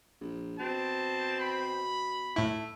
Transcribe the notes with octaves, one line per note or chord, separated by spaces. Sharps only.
A#1
B2 C4 A5
B5
A2 A3 E4